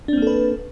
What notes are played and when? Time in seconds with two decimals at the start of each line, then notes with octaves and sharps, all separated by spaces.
0.08 D4
0.13 C4
0.18 A#3
0.22 A4
0.27 B4